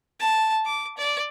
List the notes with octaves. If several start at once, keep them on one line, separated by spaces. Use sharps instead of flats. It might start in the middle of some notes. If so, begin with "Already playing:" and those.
A5
D6
D5